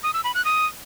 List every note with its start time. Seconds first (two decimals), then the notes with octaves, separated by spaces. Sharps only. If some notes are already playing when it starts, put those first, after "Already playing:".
0.03 D#6
0.14 E6
0.24 B5
0.34 F#6
0.45 D#6